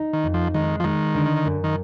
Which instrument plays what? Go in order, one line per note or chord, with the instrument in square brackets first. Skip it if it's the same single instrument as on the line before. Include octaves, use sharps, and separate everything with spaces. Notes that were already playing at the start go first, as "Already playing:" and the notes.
Already playing: [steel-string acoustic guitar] D#4
[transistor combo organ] D#3
[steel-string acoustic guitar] F2
[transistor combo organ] F3
[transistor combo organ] D#3 [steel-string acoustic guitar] G#3
[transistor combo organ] F3
[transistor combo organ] D#3 [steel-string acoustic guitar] G#3
[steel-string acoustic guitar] D3
F#2
[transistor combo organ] D#3